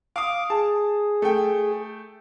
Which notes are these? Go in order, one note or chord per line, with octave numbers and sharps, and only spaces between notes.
F5 D6 D#6
G#4 A5
A3 G5